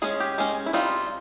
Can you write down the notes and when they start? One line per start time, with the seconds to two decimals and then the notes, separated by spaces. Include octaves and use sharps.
0.02 G#3 C#4 G#4
0.20 G4
0.38 G#3 C#4
0.66 E4
0.73 G3 C4 D#4 F4